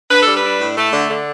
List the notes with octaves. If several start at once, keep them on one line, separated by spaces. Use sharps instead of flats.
D4 B4
G3 A4
B4
D4
A2
A3
D3
D3